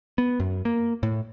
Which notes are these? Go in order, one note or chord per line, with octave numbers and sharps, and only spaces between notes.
B3
F#2
A#3
A2